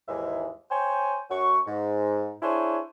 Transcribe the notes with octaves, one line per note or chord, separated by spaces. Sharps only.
D#2 G#2 E3 G#3 E5
C5 C#5 G5 G#5
F#2 F#3 F#4 C#6
G#2
D4 E4 G#4 C5 C#5